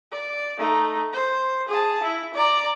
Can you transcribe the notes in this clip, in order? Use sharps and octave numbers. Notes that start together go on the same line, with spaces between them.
D5
A3 D#4
C5
G#4 A5
E4
D5 A#5